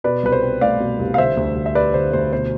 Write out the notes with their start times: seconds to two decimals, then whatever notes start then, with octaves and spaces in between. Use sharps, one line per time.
0.04 B2 B4 D5
0.24 C2 B4
0.32 C5
0.42 C4
0.61 A3 D5 F5
0.80 B2
0.99 C2
1.14 F5
1.18 D3 C5 E5
1.37 D2
1.56 D2
1.66 E5
1.75 G3 B4 D5
1.94 D3 C5
2.13 D2 C5
2.33 B2 C5